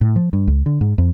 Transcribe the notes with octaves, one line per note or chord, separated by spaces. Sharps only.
A2
F3
G2
C#2
D3
G#2
F2